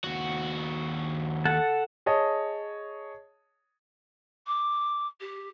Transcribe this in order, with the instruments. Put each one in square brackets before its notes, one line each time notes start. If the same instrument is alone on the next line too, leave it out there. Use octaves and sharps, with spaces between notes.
[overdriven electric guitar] D#2 F#4
[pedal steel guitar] A4 F#5 A5
[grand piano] G#4 C#5 D#5 A5
[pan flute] D6
G4